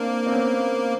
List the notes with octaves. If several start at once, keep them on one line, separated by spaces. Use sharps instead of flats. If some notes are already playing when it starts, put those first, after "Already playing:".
Already playing: A#3 C4 D4
C4
B3 C#4